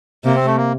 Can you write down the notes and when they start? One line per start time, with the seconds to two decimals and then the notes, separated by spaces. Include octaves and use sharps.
0.25 C3 A#3
0.35 C4
0.45 A3
0.56 A#3